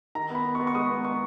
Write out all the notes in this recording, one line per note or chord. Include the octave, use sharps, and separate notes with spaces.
D#3 A#5
B3
B5
B3
C#6
B3
C#6
G#3 D#6
B3
B3 C#6